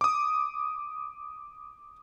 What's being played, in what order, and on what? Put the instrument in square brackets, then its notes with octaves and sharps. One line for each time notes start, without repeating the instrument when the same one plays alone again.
[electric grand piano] D6 D#6